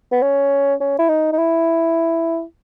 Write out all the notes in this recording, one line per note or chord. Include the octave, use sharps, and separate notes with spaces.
B3
C#4
C#4
E4
D#4
D#4
E4